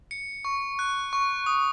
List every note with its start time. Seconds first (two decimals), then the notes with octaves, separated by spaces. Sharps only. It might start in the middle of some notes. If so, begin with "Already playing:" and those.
0.11 C#7
0.45 C#6
0.79 F#6
1.13 C#6
1.46 D#6